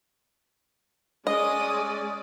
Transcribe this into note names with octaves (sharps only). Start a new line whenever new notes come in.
G#3 C#4 D5 D#5 D#6